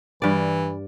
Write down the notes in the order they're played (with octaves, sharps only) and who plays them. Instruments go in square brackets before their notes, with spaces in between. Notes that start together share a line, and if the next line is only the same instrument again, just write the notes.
[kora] G2 D5 [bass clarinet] E3